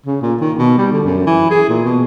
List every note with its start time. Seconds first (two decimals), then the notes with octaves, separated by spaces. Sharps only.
0.06 C#3
0.22 A#2
0.41 D#3
0.58 B2
0.78 G3
0.92 D3
1.03 F#2
1.26 E3
1.51 G#4
1.69 A#2
1.85 B2